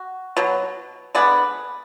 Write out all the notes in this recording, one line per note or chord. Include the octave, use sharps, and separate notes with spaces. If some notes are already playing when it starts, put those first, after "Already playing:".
Already playing: F#4
B2 F#3
D3 G#3 B3 D5